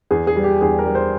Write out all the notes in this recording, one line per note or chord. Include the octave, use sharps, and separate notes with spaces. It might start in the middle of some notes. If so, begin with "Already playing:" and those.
E2 G#4
G#4
G3
G4
E2 G#4
A#4
G3
C5